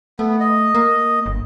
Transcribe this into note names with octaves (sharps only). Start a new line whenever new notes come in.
A3 B3
D#5
A#3
G1